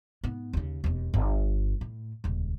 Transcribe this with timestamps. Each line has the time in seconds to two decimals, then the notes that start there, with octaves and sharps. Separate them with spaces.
0.24 G#2 B3
0.53 D#2 C#3
0.84 E1 D#2
1.14 G1
1.81 A2
2.24 D#1 C#2